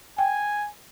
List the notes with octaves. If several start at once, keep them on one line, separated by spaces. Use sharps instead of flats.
G5 G#5